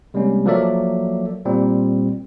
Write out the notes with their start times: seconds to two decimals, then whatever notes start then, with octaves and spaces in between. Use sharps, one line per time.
0.14 C3 G3 G#3 A#3 C#4
0.45 F3 F#3 A#3 A4 D5 E5
1.45 A#2 G3 C4